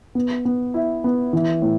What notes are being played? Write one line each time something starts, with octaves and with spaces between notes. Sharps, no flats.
B3
B3
E4
B3
E3
A2